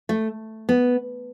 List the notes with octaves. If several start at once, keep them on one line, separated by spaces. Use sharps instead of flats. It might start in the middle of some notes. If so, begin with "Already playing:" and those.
A3
B3